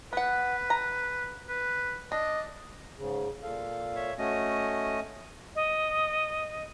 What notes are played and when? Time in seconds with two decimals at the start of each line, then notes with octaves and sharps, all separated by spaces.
0.13 B3 B4 F#5
0.70 A#5
1.49 B4
2.12 D4 D#5
2.97 G#2 C#3
3.42 A#2 A4 F5
3.96 C#5 E5
4.18 A3 C#4 F#4 D#5
5.55 D#5